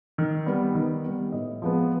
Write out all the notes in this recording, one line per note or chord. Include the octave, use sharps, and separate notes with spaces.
D#3
G3 B3
D#3
G3 B3
A2 D#5
F3 G#3 B3